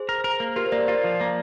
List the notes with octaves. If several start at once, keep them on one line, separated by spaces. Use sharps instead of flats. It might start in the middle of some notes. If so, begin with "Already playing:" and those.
Already playing: G#4 C5
A#4
A#4
A#3
F4 G4 A#4
C5
A#3 A#4 D5
F4 D5 F5
F3
A#3